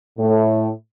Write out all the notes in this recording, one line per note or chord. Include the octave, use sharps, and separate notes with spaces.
A2